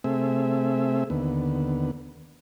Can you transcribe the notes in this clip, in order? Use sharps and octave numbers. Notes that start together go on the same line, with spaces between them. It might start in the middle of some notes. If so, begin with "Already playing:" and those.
C3 A3 C4 G#4 E5
D#2 D3 B3